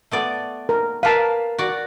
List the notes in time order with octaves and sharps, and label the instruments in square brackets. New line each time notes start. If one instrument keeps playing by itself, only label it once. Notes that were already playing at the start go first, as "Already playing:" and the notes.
[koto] A3 B3 D5
[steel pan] A#4
[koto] A#3 B4 [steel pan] F5 A5
[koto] F#4 D5